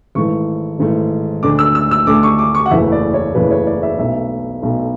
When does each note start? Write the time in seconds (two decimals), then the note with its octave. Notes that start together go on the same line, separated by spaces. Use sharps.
0.15 G#1 G#2 E3 A3 C#6
0.79 G#1 G#2 E3 A3
1.43 D2 D3 A3 D4 D6
1.59 E6
1.75 E6
1.91 E6
2.07 D2 D3 A3 D4 D6
2.23 C#6
2.39 D6
2.55 C#6
2.66 F#5
2.71 F#1 E2 C#3 E3 A3 E5
2.92 D5
3.14 C#5
3.35 F#1 E2 C#3 E3 A3 B4
3.51 C#5
3.67 D5
3.83 E5
3.99 B1 B2 A3 E5
4.63 B1 B2 A3